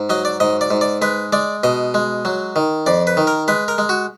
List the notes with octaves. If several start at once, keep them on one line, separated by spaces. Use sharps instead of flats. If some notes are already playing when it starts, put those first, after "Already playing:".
Already playing: G#2
F#3 D#5
D5
G#2 D#5
D5
G#2
D5
G#3 B4
G#3 D5
B2 D#5
G#3
F#3
D#3
F2 D5
B4
D#3
A#4
G#3 B4
A#4
G#3
F#4